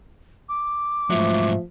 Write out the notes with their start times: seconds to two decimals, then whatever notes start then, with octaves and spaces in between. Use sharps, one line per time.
0.49 D6
1.10 G#2 F3 F#3 A3